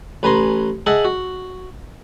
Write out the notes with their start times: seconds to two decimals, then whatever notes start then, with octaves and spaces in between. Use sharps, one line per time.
0.23 A1 B4 G#5 A#5 C6
0.86 G#4 D#5 E5 F#5 A5
1.04 F#4